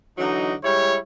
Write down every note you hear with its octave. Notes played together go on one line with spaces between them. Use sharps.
D3 E3 F#3 D#4
G3 G#3 E4 C#5